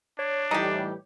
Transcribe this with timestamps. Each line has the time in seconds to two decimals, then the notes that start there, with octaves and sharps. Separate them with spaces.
0.19 D4 C#5
0.51 A2 E3 G3 D#4 G4